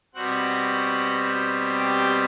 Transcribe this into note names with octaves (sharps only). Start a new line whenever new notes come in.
B2 G3 C4 F#4 F#5
G4 G5